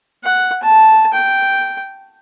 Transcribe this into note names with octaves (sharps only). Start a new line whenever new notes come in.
F#5
A5
G5